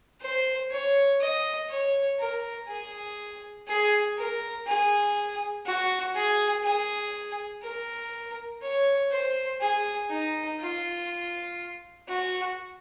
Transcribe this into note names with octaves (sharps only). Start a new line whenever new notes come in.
C5
C#5
D#5
C#5
A#4
G#4
G#4
A#4
G#4
F#4
G#4
G#4
A#4
C#5
C5
G#4
D#4
F4
F#4